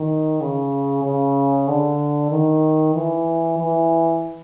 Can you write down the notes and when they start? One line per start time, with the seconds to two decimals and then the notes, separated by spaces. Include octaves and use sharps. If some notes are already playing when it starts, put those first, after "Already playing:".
Already playing: D#3
0.41 C#3
1.04 C#3
1.68 D3
2.31 D#3
2.95 E3
3.58 E3